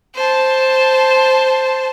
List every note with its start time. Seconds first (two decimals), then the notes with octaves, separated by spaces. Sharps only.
0.15 C5 A5